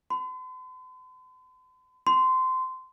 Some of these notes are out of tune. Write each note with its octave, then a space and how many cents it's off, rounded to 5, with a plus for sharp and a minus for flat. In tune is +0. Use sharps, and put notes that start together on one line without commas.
C6 -45
C6 -20